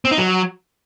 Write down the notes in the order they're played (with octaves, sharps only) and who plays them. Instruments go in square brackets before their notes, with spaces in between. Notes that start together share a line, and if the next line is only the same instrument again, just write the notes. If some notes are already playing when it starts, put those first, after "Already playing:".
[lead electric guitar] C4
D#4
F#3